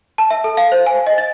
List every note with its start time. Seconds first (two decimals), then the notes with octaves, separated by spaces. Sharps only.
0.18 A5
0.30 E5
0.44 A4
0.57 F5
0.72 C5
0.86 G#5
1.06 D#5
1.18 A6